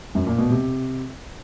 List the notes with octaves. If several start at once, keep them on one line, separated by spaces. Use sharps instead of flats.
F#2
A#2
B2
C3